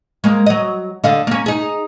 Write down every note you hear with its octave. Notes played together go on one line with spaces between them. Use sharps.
G#3 A#3
F#3 D#5
D3 D#5 F5
A#3 C#4
D#4 G#4